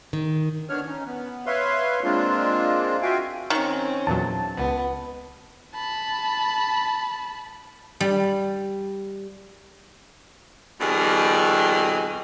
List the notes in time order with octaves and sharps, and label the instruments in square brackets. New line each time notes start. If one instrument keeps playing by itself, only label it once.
[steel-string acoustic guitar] D#3
[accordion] D#3 B3 D4 C#5 F6
C#4 D#4
B3
B4 C#5 E5 F5 C6
G#3 A#3 C4 D4 F4
F4 F#4 E5 F5 G5 G#5
[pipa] D#3 [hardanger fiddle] C4 C#4 [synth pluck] C#6 C#7
[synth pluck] E2 A#2 F#3 [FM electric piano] A5
[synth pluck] C#2 [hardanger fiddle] B3
[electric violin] A5 B5
[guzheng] G3
[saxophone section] F2 B2 D#3 G3 G#4